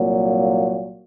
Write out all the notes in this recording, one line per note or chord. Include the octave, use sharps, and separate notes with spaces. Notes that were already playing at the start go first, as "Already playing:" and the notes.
Already playing: C2 A#2 F#3 A#3